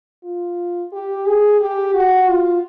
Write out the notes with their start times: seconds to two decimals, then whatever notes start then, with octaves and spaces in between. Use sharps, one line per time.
0.24 F4
0.93 G4
1.26 G#4
1.61 G4
1.94 F#4
2.29 F4